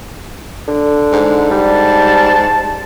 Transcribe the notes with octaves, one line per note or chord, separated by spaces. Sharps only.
D3
G#2
G3 A5